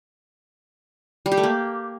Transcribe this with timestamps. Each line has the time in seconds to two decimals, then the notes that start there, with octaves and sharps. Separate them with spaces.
1.26 G3
1.32 G4
1.37 A3
1.43 A#3